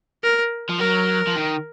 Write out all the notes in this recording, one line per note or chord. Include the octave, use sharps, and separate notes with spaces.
A#4
F3
F#3 A#4
F3
D#3